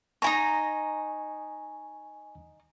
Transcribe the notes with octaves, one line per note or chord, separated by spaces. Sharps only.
D#4 E4 G#5 A#5 C#6